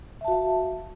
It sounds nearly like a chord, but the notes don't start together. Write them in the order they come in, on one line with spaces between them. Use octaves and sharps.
E5 A5 F#4 F5